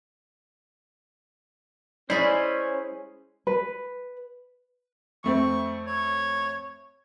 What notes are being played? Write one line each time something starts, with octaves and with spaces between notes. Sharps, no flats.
G#3 C#4 E4 C5 D5 B5
B4
F2 A3 C4 C#6
C#5